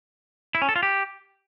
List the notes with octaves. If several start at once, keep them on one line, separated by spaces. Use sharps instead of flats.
E4
C#4
A4
F4
G4